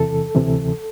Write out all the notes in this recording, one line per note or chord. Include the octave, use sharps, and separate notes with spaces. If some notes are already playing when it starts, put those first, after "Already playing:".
Already playing: E2 C3 E3 A4
D2 C3 E3